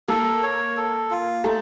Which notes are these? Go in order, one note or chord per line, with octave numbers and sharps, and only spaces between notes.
A#3 A4 A#4
C#5
A4
F4
A3 D#4 A4